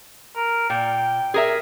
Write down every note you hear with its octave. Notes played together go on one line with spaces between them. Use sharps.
A#4
A#2 G5
G#4 A#4 E5